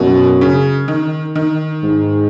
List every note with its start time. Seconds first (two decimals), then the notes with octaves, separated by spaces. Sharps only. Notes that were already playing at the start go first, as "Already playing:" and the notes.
Already playing: F#2 B2
0.41 C#3
0.88 D#3
1.35 D#3
1.83 G#2